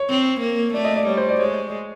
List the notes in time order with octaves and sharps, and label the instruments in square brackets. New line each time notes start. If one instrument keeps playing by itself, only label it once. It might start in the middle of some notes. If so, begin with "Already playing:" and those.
Already playing: [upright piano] C#5
[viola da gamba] C4
A#3
[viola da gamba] A3 [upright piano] D5
[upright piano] D#5
D5
[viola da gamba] G3 [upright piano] C#5
[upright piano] C5
D5
[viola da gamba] G#3 [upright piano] C#5